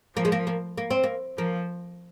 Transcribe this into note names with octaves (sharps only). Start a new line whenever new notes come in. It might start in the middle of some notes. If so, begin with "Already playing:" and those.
F3 A#3
G#3
A#3
A#3
A#3
C4
A#3
F3 A#3